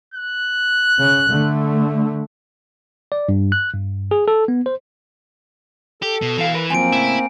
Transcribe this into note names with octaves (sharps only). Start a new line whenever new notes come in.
F#6
C#3
D3 A3
D5
G2
F#6
G2
G#4
A4
B3
C5
G4 A4
B2
B2 E3 F5
A#4 B4
F#2 F3 A#3 C4 G#5 D7
A2 C#3 E4